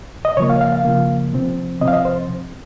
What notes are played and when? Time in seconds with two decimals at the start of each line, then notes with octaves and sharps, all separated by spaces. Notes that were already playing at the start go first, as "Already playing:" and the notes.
0.25 D#5
0.37 C#3 C#5
0.40 F3 A#3
0.50 F5
0.61 F5
0.73 F5
0.85 C#3 F3 A#3
1.33 C3 F3 C4
1.81 C3 F3 C4 D#5
1.88 F5
1.93 D#5
2.05 C5